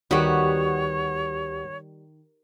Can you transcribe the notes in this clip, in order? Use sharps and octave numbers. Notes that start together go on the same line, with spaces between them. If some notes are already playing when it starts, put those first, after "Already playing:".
D2 D#3 G3 B3 F#4 G4 C#5 B5